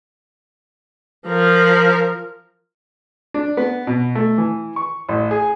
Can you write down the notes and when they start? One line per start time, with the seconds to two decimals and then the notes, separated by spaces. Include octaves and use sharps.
1.28 F3 A#4
3.34 D4
3.57 B3
3.87 B2
4.15 A3
4.38 E3
4.76 C#6
5.09 A1
5.31 G#4